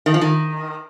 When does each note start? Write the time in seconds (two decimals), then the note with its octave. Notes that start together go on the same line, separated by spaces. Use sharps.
0.06 D#3
0.14 F3
0.21 D#3